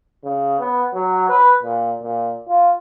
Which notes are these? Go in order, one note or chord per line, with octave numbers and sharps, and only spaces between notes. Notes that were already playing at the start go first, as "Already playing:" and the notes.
C#3
B3
F#3
B4
A#2
A#2
F4